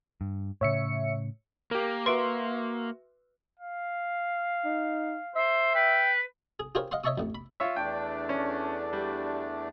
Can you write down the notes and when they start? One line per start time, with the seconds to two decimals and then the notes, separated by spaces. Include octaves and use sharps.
0.21 G2
0.61 A2 C#3 C#5 E5 C#7
1.71 A#3 G4 A#4
2.06 F#4 B4 E5 C6 D7
3.59 F5
4.65 D#4
5.36 C5 E5
5.75 B4 G5
6.60 G#4
6.75 F4 G4 G#4 A#4 C5 C#5
6.91 D#5 F5 F#5 C6
7.04 C#5 D#5 E5 A5 C#6 D#6
7.18 A1 F2
7.35 B5
7.60 F4 C#5 E5
7.76 E2 A3 D4 G5
8.29 C#4
8.93 G3